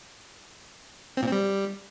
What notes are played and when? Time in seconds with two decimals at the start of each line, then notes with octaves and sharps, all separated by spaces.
1.17 C4
1.22 A#2
1.27 C4
1.32 G3